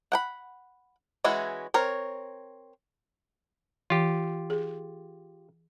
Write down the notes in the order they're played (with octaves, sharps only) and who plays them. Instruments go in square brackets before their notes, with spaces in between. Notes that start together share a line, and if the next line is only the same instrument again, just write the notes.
[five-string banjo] F#5 G5 B5
E3 G#3 C#4 E4 F#4
C4 A#4 C#5
[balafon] E3 [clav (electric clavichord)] F4 G4
[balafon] G#4